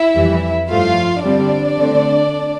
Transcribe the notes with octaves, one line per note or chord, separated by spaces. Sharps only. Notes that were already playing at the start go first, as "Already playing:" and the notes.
Already playing: E4 E5
F2 E3 G3
G2 F3 A3 F4 F5
D3 G3 C4 D4 D5
D3 A3 C4